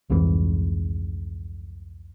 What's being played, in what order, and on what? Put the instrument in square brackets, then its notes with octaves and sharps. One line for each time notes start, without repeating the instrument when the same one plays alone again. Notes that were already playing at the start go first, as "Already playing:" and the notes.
[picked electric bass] C2 F2 G#2 E3